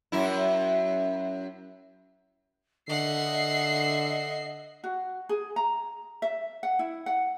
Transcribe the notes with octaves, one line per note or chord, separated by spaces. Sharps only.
F#2 E4
D3 D#5 E5 F#5 C7
F#4
G#4
A#5
E5
F#5
E4
F#5